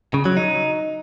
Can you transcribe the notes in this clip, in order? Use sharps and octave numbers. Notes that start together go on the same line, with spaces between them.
C#3
F#3
D#4